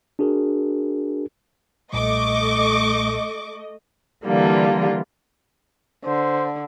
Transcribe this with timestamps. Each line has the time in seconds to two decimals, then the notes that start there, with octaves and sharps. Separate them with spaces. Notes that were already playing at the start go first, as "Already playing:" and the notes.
0.19 D4 F#4 G#4 A#4
1.93 B1 A#2 G3 A3 D#5 C#6 D6
4.26 D3 E3 G3 A#3 F4
6.05 D3 C5